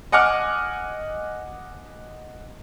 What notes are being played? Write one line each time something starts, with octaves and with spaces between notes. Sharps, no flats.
D#5 F#5 G#5 D6 F6